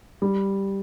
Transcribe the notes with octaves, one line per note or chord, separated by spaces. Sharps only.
G3